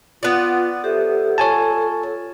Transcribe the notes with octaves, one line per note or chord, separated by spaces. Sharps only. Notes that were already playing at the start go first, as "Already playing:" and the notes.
B3 F4 D5
G4 A4 C5 E5
F4 C#5 G#5 A5